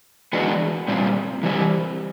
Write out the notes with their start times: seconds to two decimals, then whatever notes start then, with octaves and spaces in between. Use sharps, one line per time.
0.33 E3 G#3 B3 D4 F#4
0.88 A#2 G3 C4
1.43 E3 G3 C4